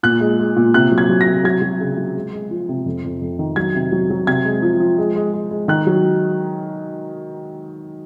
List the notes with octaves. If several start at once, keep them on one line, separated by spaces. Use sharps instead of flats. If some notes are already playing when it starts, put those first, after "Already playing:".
A#2 F#6
G#3
G#3
A#2
C3 F#6
F#3
G#6
F#3
A#6
C3
F#3 G#6
F#3
C#3
F#3
G#3
G#3
F3
C3
F2
F2
F2
D#3
F#3 G#6
C3
F#3
F#3
C3 G#6
G#3
F3
F3
G#3
G#3
G#3
G#3
D#3 F#6
F#3